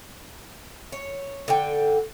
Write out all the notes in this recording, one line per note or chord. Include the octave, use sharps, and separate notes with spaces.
C#5
D3 G5